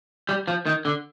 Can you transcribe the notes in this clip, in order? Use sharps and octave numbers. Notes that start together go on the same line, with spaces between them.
G3
F3
D#3
D3